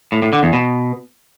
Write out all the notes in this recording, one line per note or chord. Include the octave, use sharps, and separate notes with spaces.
A2
A2
D3
E2
B2